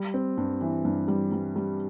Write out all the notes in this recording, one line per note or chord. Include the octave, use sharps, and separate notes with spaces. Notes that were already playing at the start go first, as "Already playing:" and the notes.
Already playing: G3
C4
G2
E3
G2
G3
G3
G3